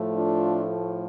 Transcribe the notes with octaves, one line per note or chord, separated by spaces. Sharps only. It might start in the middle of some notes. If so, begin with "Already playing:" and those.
Already playing: A2 F3 A3
D4 F4